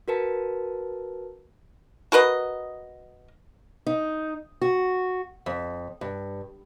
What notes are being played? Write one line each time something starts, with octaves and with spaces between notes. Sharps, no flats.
F#4 A#4 B4 A5
F#4 A#4 B4 D#5
D#4
F#4
F2
G2